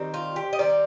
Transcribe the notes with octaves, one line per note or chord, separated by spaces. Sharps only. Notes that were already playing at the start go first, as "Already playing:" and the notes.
Already playing: D#3 G3 C4 D#4
F4
G4
D#5
D#3 G3 C4 D#4 D5